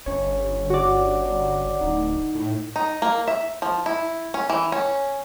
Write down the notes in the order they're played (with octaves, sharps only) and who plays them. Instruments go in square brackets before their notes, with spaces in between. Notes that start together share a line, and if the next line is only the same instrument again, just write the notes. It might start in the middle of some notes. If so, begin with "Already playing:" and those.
[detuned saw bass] G1 [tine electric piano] C#4 C#5
[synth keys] F#4 D5
[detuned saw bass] D1 [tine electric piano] D#4
[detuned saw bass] A2
[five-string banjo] D#4
A#3
E5
F3
E4
C#4
E3
C#4